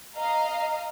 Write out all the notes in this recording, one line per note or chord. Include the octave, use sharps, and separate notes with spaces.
D#5 F5 A#5